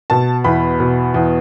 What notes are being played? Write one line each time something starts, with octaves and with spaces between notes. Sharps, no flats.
B2 A5
E2 B5
B2
E2